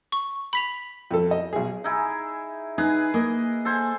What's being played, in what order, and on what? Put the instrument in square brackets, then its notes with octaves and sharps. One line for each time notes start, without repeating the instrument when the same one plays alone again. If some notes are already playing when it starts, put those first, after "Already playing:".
[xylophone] C#6
B5 B6 F7
[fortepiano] F2 A4
D#5
B1 G#4
[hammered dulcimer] D#4 E4 G#4
[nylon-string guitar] D#4 [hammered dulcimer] G#4 B4
[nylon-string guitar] A#3 [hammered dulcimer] G#4 D#5
[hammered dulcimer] A4 C5 G#5